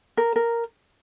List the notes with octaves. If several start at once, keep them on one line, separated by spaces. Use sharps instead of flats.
A#4
A#4